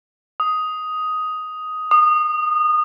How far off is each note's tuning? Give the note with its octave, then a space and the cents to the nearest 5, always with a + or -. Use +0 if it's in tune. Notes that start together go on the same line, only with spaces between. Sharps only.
D#6 +5
D#6 -25